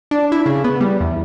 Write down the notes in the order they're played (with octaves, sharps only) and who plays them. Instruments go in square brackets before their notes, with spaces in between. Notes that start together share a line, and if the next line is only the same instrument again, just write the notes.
[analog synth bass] D4
E4
C#3
B3
G3
E2